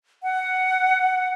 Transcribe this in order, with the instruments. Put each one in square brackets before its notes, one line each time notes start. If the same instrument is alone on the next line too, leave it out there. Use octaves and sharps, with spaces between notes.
[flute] F#5